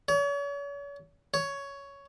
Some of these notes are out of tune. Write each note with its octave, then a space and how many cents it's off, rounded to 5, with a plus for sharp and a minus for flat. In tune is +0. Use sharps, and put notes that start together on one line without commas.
C#5 +40
C#5 +10